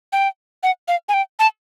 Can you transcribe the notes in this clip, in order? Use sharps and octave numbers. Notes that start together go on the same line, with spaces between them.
G5
F#5
F5
G#5
G5
A5